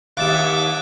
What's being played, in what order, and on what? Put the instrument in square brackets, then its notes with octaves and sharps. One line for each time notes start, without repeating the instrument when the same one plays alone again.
[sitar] D#2 [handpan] G4 E5 F5 [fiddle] D6 [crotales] F#6 A6 E7